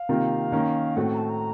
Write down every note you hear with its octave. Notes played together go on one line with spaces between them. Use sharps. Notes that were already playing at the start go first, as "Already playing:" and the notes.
Already playing: F5
C3 D#3 A#3 F4
D#3 A#3 C#4
A2 A3 C4 F#4 F#5
A#5
A5
A#5